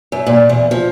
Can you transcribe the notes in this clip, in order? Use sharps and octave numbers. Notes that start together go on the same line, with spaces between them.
F#2
A#2
E2
F3